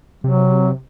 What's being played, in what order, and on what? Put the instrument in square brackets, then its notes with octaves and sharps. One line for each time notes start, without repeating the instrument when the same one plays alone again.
[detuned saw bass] C3 [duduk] F#3